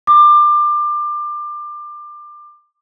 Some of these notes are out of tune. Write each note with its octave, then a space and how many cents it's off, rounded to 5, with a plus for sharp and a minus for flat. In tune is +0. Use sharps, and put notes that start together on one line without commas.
D6 +25